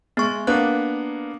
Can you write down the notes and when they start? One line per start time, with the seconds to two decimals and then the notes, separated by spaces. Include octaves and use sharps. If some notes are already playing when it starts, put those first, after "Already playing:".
0.17 G#3 B3 C#6 A6
0.47 A#3 B3 D4 F#6